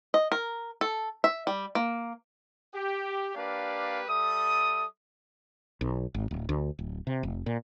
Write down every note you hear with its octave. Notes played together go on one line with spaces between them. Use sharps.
D#5
A#4
A4
E5
G3
A#3
G4
A#3 D4 G4 B4 D5 F5
G3 A4 E5 D#6
B1
G#1
D1
D2
D1
C3
F1
A#2